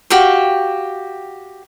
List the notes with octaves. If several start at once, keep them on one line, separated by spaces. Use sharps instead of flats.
F#4 G4 F5 G5